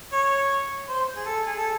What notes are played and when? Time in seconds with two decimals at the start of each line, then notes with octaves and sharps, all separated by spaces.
0.12 C#5
0.89 C5
1.16 G#4
1.26 A4
1.46 G#4
1.57 A4